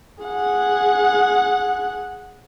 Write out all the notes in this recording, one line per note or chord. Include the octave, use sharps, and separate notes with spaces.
G#4 F#5